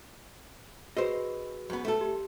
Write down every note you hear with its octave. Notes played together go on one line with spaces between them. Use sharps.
F#4 G#4 B4 C5 D#5
F#2 B3
A3 A4
G4